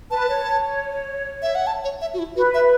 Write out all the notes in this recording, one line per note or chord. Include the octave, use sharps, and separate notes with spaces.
B4 A5
C#5
E5
F#5
A5
C#5
E5
F#4
E4
F#4 B4
E5